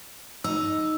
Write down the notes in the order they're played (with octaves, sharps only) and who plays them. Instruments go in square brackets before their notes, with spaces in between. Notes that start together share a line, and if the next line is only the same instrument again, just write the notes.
[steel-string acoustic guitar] D#4 [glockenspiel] E6